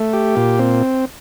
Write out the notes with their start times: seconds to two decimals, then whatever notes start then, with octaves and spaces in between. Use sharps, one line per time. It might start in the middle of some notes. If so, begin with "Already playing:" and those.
Already playing: A3
0.13 G4
0.36 A#2
0.59 C4